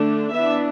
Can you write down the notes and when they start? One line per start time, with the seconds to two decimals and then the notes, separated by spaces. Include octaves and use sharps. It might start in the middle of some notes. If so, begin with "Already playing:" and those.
Already playing: D3 A3 D4
0.33 E3 B3 D4 E5